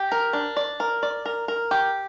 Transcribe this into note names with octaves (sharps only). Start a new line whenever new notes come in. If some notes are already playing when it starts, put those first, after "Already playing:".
Already playing: G4
A#4
D4
D5
A#4
D5
A#4
A#4
G4